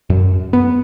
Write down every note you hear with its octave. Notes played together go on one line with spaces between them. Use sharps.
F#2
B3